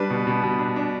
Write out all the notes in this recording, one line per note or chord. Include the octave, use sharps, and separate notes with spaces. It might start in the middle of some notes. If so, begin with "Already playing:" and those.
Already playing: G3 D4 B4
B2
B2
B2
D4
D4